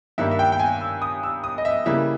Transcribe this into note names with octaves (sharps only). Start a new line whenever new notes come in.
G2 D#3 G3 A#3 E5
E5
G5
G5
G#5
E6
D#6
E6
D#6
D#5
E5
C#3 E3 G3 A#3 E5